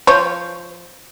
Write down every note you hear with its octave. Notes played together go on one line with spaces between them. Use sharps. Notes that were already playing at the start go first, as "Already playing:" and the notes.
F3 C5 C#5